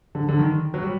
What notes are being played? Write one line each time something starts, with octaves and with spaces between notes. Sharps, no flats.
D3
D3
D#3
F#3
G3